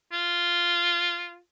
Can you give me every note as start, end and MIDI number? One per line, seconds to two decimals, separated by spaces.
0.12 1.39 65